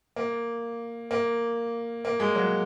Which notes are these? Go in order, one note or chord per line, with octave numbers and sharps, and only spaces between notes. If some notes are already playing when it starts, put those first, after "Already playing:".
A#3
A#3
A#3
G#3
F#3